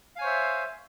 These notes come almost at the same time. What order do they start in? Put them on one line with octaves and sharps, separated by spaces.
F5 G#5 C#5 C5 E5